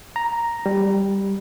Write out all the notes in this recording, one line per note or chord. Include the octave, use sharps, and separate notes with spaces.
A#5
G3